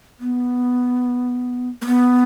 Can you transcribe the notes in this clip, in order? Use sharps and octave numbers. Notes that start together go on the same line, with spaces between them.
B3
A#3
B3